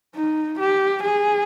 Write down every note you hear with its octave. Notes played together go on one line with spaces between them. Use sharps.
D#4
G4
G#4